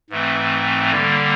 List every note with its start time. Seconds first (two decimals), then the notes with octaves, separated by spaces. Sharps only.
0.10 G#2 E3 A3 C4
0.91 D3 G3 A#3